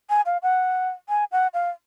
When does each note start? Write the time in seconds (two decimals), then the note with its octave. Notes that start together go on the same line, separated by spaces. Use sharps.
0.10 G#5
0.26 F5
0.43 F#5
1.09 G#5
1.32 F#5
1.54 F5